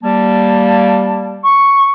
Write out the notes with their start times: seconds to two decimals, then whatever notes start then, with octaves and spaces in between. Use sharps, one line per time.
0.02 G3 A#3 A5
1.43 C#6